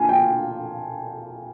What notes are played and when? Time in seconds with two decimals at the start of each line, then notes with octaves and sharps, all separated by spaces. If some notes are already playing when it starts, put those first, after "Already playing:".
Already playing: A#3 F4 G#5 A5
0.09 G5